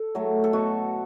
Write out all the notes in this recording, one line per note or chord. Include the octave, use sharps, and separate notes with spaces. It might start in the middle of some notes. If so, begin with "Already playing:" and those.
Already playing: A4
F#3 A3
A4
B2 F#4